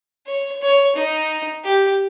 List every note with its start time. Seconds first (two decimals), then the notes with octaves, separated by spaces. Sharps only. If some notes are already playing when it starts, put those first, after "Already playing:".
0.26 C#5
0.61 C#5
0.95 D#4
1.63 G4